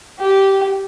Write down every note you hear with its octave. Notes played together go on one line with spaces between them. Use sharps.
G4